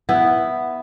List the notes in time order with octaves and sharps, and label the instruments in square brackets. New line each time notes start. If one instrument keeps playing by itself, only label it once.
[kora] B3 E4